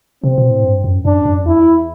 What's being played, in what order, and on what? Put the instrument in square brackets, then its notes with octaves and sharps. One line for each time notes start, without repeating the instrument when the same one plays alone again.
[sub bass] C3 [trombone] C4
[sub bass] B2
A2
G2
F#2
[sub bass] F#2 [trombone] D4
[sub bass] F#2
[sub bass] E2 [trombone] E4